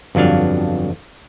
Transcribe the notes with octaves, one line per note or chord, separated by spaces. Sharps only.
G1 F2 F#3 D4 F5